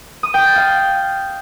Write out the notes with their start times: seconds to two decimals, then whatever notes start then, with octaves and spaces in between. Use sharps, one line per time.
0.23 D#6
0.34 G5
0.45 A6
0.56 F5